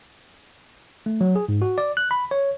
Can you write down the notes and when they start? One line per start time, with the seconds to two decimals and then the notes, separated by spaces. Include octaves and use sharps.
1.06 A3
1.21 F#3
1.36 G#4
1.49 G#2
1.62 F#4
1.78 D5
1.97 F#6
2.11 B5
2.31 C#5